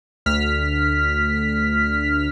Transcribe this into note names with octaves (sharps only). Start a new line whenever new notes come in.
D2 F6 B6